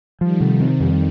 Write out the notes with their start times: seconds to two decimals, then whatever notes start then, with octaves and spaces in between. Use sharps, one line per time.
0.21 D#3 F3 G3
0.41 C3
0.61 C4
0.80 F2